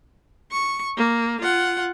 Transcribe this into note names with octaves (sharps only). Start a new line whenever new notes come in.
C#6
A#3
F4 F#5